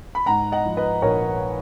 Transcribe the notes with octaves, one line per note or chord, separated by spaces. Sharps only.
B5
G#2 F#5 A#5
D#5 F#5
F3
B4 D#5
A#1 A#4 C#5